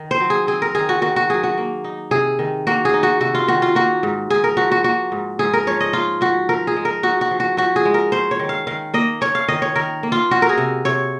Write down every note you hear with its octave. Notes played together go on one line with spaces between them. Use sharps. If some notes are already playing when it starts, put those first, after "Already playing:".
Already playing: D#3
C5
F#3
G#4
C4 G#4
A#4
D#3 G#4
F#4
D#3 F#4
F#4
F#3 G#4
F#4
A#3
D#4
C3 G#4
D#3
A#3 F#4
G#4
D#4
F#4
C3 F#4
F4
D#3 F#4
F4
A#3 F#4
G#2
G#2 G#4
A#4
F3 F#4
F#4
A#3 F#4
G#2
G#2 G#4
A#4
F3 C#5
D#5
D#4 F4
F3 F#4
F3 A#4
G#4
G#3
A#4
D#4 F#4
F#4
F3
F#4
F3 F#4
G#4
G#3
A#4
C#4 C5
C#5
D#3
F5
D#3 F5
A#3 D#5
C#4 C#5
F5
D#3 D#5
C#5
D#3 A#4
A#3
F4
C#4 F#4
A#4
G#4
C3
C3 C#5